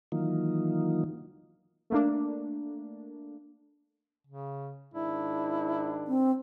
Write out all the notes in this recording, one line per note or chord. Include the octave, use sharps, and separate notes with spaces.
D#3 E3 F#3 A#3 D#4 F4
A3 A#3 D4
C#3
G#2 D#3 D4 E4
C4